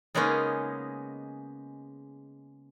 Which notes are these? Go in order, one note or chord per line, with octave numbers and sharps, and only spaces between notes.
C#3 G#3 A#3 B3 C#4 D#4